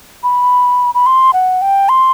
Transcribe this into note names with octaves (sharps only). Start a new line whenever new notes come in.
B5
B5
C6
F#5
G5
C6